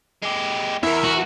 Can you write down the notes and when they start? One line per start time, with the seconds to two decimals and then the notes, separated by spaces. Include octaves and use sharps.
0.23 G#3 G4
0.83 E2 E4 A#4 E5
1.04 F#4